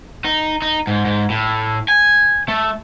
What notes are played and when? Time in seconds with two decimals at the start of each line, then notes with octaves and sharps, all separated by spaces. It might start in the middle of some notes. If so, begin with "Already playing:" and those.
0.25 D#4
0.62 D#4
0.87 G#2
1.05 G#2
1.30 A2
1.88 G#5
2.48 A3